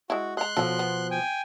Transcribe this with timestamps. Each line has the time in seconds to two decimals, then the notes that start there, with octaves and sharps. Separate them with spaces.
0.10 G#3 E4 F#4
0.37 G#3 A#5 C6 F#6
0.57 B2 F3 F#3 A4
0.79 B3
1.11 G5 G#5